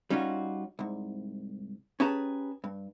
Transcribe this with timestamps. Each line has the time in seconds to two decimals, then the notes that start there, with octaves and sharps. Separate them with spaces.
0.10 G3 C#4 D#4 F4 F#4
0.79 C2 G#2
2.00 C#4 G4 G#4 B4 A5 A#5
2.64 G2